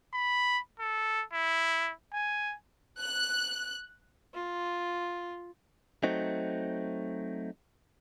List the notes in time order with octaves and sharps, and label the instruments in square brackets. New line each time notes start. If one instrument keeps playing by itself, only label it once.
[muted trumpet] B5
A4
E4
G#5
[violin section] F#6
[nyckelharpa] F4
[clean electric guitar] F#3 A3 C4 D#4